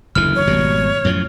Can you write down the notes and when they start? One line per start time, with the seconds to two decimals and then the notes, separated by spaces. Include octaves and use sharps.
0.15 F#1 D2 E3 F6
0.35 C#5
0.47 G#1 B2 G3
1.05 F#2 A2 F3